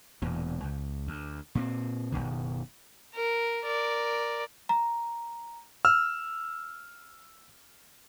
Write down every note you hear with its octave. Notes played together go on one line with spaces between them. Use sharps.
E1 E2 A#2
C#2
D2
A#2 A3 C4
F#1 D#2 B2 D#3
A#4
A#4 D5
A#5
E6 F6